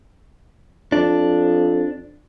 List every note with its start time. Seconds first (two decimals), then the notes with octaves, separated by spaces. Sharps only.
0.92 F2 D4